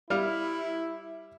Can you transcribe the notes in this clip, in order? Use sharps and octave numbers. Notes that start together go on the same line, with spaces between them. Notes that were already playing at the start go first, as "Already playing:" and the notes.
G3 E4 F5